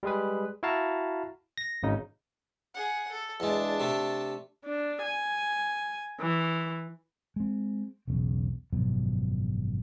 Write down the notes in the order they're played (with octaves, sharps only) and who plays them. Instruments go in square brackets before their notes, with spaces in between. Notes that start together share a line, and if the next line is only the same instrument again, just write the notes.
[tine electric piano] G3 G#3 G#4 B4
E4 F#4 F5 A5 A#5
A#6
G#1 C#3 D#4
[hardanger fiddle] G#4 F#5
A4
[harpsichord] E2 G#3 [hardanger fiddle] D4 A5
[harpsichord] C3 A3
[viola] D4
G#5
E3
[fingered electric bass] G#3 C4
E1 B1 E2 C#3
G#1 F#2 B2 F3